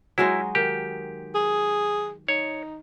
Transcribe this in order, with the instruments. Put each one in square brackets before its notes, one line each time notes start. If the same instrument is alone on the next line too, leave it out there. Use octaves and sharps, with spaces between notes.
[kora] F#3 G#3 D#4 [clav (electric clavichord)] E4
[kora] D#3 [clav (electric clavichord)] G4
[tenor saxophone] G#4
[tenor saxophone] D#4 [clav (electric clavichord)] C#5